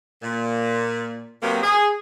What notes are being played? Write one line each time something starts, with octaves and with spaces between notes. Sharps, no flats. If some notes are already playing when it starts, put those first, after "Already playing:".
A#2
C3 F#3 A#3 B3
G#4